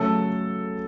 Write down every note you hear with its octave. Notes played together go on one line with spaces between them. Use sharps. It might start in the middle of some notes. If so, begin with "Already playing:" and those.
Already playing: C#3 F#3 A3 A4